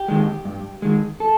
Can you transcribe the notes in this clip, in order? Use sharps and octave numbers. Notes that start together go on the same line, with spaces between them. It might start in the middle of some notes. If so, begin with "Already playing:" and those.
Already playing: G4
D#3 G#3
G2
D#3 G#3
A4